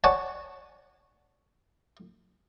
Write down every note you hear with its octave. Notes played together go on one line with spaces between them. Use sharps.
C#5 D5 F#5 G#5 A5